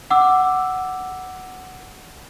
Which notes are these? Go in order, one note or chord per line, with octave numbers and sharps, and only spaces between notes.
F#5 D6 E6